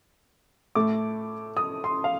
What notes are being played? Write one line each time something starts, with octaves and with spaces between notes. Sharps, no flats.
A2 A3 D6
D#6
C6
F5